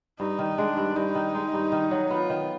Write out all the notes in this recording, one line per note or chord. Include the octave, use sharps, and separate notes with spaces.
G2 D#4
D#3
G#3 D4
G2
G2 D#4
D#3
G#3
G2
D#3
F#3
B3 F4
D#3